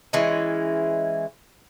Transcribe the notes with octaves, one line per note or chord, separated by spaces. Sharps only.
E3 G#3 C#4